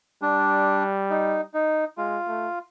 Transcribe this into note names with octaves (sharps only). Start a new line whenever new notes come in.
G3 D4
D#4
D#4
G#3 F4
A3